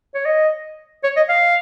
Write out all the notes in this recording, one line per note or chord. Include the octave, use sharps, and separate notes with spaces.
C#5
D#5
C#5
D#5
F5